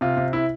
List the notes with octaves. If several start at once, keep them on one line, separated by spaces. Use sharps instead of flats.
C3 F4
C3
E4